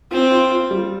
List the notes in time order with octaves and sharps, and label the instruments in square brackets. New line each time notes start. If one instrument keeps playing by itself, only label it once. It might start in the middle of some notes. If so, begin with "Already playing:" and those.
[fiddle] C4 [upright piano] F4
[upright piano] F4
F4
G3